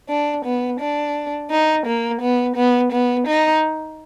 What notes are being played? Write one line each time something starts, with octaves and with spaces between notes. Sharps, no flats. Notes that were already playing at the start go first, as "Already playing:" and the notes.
D4
B3
D4
D#4
A#3
B3
B3
B3
D#4